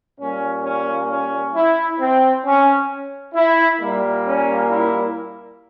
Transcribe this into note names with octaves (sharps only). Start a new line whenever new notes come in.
A#2 G3 A#3 C#4
C#4
C#4
E4
C4
C#4
E4
A#2 G3 A#3
C#4
E4